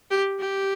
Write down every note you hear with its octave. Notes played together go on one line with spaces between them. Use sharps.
G4
G4